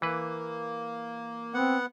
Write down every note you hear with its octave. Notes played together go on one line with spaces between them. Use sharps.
E3 A#3 B4
B3 C4 F#5